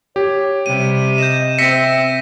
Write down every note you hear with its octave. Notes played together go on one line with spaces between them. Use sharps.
G4 C#5
C3 G3 D#7
D#5 G6 E7
C4 E5 A#6 B6 C#7